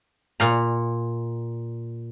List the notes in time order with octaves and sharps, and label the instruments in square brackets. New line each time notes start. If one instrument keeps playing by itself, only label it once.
[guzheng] A#2 F5 A#5